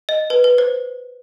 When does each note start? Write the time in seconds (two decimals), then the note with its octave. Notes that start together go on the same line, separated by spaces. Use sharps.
0.09 D#5
0.30 B4
0.44 B4
0.58 C5